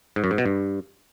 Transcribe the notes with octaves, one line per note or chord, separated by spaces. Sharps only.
G#2
F#2
G#2
B2
G2